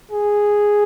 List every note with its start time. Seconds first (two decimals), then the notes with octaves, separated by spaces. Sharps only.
0.11 G#4